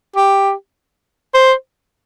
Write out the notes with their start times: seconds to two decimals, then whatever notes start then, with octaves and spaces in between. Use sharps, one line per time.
0.16 G4
1.34 C5